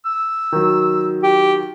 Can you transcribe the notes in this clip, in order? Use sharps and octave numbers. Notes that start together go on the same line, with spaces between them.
E6
D#3 F#3
G4